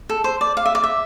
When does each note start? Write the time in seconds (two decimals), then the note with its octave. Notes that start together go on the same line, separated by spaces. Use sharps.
0.09 A4
0.24 C5
0.41 D5
0.57 F5
0.66 E5
0.75 D5
0.84 E5